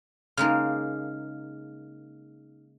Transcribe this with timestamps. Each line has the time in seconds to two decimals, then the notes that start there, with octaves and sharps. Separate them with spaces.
0.37 C#3 G#3 A#3 D#4 F6